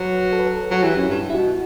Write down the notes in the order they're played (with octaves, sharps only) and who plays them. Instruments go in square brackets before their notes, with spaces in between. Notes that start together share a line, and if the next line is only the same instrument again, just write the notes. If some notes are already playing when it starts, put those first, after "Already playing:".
Already playing: [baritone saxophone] F#3 [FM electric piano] B4
[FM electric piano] A4
B4
A4
[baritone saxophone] F#3 [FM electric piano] F#4
[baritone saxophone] E3 [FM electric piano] G4
[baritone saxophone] F#2
G2
[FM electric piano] E4
[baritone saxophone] B2 [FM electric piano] F#4